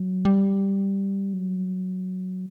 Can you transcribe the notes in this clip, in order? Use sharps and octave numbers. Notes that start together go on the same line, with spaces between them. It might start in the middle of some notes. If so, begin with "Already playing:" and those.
Already playing: F#3
G3
F#3